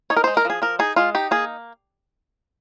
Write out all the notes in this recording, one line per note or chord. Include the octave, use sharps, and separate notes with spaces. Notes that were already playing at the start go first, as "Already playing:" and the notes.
D#4 C#5
A#4
G#3 C5
A#4
F3 G#4
F3 A#4
D#4 G#4
G#3 F4
D#4 G4
A#3 G#4